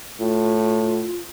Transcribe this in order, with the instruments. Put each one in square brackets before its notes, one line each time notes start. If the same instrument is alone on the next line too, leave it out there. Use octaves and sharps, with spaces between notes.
[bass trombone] A2 [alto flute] F4